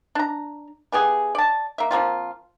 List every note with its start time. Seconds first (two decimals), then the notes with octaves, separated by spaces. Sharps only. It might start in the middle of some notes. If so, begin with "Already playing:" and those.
0.15 D4 A#5
0.92 E3 B3 G4 G#4
1.35 D5 A5
1.78 A#3 E5
1.91 F3 A#3 C4 F4